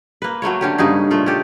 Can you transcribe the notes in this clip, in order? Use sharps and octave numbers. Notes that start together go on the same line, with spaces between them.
A#3 B4
F#3 A3 A#3 C#5
D3 C#4 G4
G2 C#3 D#4 G#4
A#2 A3 F4
C#4 G4 A4